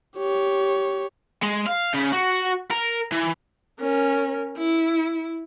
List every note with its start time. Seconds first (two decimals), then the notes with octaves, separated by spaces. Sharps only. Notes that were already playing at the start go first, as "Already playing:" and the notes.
0.17 G4 C#5
1.43 G#3
1.66 F5
1.94 C#3
2.13 F#4
2.71 A#4
3.12 E3
3.80 C#4 A#4
4.58 E4